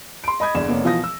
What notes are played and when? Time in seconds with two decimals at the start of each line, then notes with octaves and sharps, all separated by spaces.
0.24 C6 D7
0.40 D#5 B5 D#6 G#6
0.55 G1 E2 D5 G#6 E7
0.68 F1 A#3 B3 C#5 D5
0.84 B2 E3 F3 F5 D#6 A#6
1.04 E6